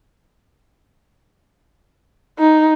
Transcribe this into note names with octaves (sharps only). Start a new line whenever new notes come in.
D#4